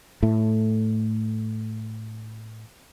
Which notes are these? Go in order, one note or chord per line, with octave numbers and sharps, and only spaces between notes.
A2 A3